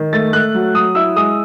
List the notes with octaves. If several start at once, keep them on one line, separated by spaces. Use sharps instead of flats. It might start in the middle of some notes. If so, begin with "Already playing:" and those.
Already playing: D#3
A3 A6
A3 F#6
F#3
F#3 D#6
E4 E6
G#3 D#6